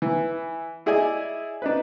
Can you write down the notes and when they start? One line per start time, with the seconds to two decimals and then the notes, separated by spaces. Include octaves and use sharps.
0.02 E3
0.86 E4 G#4 D5 D#5 G#5
1.62 D4 D#4 B4